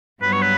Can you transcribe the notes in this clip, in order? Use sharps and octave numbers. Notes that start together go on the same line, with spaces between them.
G2 F#3 B3 B4
C#5
B4